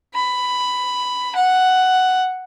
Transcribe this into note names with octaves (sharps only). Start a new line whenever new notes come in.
B5
F#5